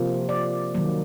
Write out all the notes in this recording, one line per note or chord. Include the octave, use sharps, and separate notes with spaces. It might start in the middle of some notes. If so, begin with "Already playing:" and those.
Already playing: C3 F3 A#3
D5
D#3 F#3 A#3